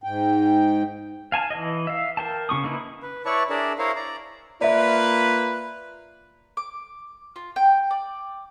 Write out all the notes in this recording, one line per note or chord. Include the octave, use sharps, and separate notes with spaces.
G#2 G5
F5 G#5 A5
E3 D#5
E5 F5
A#4 G5 A5
C#3 C#4 C#6 D#6
A#3 D#4 E4 B4
B4
E4 B4 C#5 D5 A5 C#6
D4 G#4 A#4 D5 E5
E4 A#4 C5 C#5 F5
D5 A#5
A#3 F4 B4 D5 E5
D6
F4
G5
D5